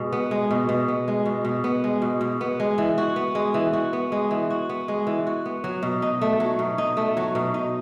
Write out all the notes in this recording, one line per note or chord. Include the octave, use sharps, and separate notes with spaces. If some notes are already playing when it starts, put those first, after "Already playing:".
Already playing: B2 G#3
B3
G#3
B2
B2
B3
G#3
B2
B2
B3
G#3
B2
B2
B3
G#3
E3
F#4
B3
G#3
E3
F#4
B3
G#3
E3
F#4
B3
G#3
E3
F#4
B3
F#3
B2
D#4
A3
F#3
B2
D#4
A3
F#3
B2
D#4